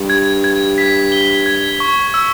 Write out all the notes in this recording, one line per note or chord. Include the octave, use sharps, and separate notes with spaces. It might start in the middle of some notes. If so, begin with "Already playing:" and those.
Already playing: G2
G#6
G#6
B6
G7
G#6
C#6
E6